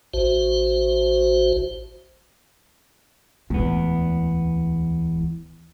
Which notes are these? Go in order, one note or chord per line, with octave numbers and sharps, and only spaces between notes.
A1 F#4 C5
D1 E2 G#3 B3